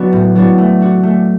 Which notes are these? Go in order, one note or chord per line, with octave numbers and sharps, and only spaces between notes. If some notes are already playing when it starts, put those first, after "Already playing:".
Already playing: F#3 B3 D4 F#4
A2
F#3 B3 D4 F#4
A3
D4 F#4
A3